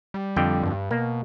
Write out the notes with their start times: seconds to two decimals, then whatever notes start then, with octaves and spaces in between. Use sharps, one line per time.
0.14 G3
0.37 F2 D3 G5
0.63 G2
0.91 B2 A#3